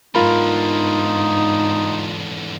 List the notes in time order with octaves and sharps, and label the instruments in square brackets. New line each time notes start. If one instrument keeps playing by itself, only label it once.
[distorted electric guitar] E2 D3 [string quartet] G#2 [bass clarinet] D#4 [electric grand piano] F4 A#4 B5